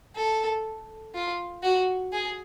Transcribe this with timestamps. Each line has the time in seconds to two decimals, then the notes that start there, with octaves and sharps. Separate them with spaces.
0.16 A4
1.15 F4
1.63 F#4
2.12 G#4